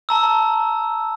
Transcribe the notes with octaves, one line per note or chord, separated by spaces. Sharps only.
A5 A#5 E6